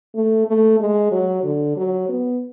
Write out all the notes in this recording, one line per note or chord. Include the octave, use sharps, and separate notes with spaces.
A3
A3
G#3
F#3
D3
F#3
B3